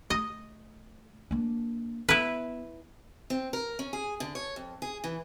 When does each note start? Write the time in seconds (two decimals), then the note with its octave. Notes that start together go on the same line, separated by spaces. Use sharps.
0.10 A3 D#5
1.31 A#3 D4
2.09 B3 E4 B4
3.30 C4
3.53 A#4
3.79 C#4
3.93 G#4
4.20 D3
4.35 C#5
4.56 F2
4.82 G#4
5.04 E3